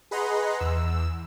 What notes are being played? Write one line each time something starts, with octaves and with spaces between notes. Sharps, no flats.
G#4 B4 D#5 F#5 A#5 C6
E2 E6